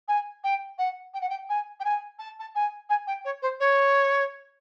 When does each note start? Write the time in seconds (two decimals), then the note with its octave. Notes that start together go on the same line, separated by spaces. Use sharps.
0.08 G#5
0.44 G5
0.78 F#5
1.14 G5
1.21 F#5
1.29 G5
1.49 G#5
1.80 G5
1.85 G#5
2.19 A5
2.40 A5
2.55 G#5
2.90 G#5
3.07 G5
3.25 C#5
3.42 C5
3.60 C#5